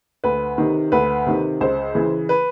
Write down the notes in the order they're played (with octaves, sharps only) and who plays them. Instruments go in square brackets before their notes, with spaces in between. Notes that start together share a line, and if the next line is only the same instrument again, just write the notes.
[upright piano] D2 B4
C3 D#3
D2 B4
C3 D#3
C#2 C5
C#3 E3
B4